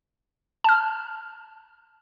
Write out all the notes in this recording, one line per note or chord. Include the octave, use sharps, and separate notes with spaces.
A5 F6